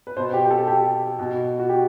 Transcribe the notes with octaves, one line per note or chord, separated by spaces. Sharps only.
B4
B2 C5
G4
G4
A4
G4
B2
F#4
G4